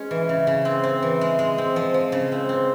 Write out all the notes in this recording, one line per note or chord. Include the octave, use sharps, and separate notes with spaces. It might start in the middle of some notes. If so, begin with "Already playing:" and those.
Already playing: G#3 C#4
E3
C#3
C#3
C4
C4
E3
G#3
G#3
C4
F3
F3
C#3
C4
C4